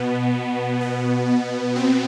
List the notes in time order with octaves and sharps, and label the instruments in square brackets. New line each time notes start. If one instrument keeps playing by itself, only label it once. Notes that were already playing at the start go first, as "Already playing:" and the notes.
Already playing: [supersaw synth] B2 B3
B3
B2
C4